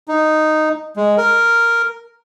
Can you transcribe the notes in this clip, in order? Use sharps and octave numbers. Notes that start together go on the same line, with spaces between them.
D#4
G#3
A#4